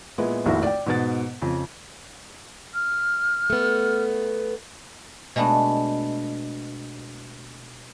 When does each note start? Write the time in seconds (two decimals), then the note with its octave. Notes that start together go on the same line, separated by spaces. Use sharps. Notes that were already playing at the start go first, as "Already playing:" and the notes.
0.18 A#2 G#3 B3 E4
0.45 F1 A#1 A2 D#3 E4 F#4
0.63 D5 G5
0.86 G#2 B2 A6
1.42 F2 C#3
2.74 F6
3.50 A3 B3
5.36 B2 G#3 A3 B3 D4